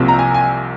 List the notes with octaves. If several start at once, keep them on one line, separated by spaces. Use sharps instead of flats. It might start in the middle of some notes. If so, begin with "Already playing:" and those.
Already playing: C2 C3 F3 A#3
A#5
G#5
G#5